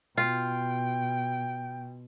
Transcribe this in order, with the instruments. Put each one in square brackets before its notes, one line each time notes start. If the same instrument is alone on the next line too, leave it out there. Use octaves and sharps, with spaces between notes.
[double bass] B2 [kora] F4 [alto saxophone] G5